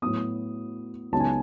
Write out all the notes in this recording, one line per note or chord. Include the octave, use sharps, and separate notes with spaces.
A2 F#3 B3 D#6
C#2 C#3 F#3 B3 D#4 A5
G#5